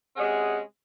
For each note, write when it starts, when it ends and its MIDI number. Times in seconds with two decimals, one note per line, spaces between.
0.16 0.60 48
0.16 0.60 56
0.16 0.60 61
0.16 0.60 68
0.16 0.60 78